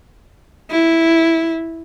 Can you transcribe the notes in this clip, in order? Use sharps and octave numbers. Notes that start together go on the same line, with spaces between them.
E4